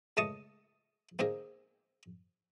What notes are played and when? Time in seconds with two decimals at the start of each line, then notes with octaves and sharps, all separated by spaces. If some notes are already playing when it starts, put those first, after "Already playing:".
0.17 C#2 A3 D#5 A5 C#6 D#6
1.19 A#3 C4 D#4 G#4 A#4